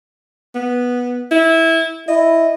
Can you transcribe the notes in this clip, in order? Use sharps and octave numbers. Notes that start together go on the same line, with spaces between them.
B3
E4
E4 D#5